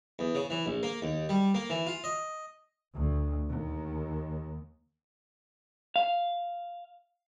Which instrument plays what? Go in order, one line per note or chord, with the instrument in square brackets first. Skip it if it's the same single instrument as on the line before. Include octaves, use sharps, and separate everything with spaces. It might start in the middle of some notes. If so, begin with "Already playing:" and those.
[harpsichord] E2
C#3
E3
A#1
A#3
D#2
G3
A#3
E3
F4
D#5
[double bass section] D2
D#2
[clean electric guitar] F5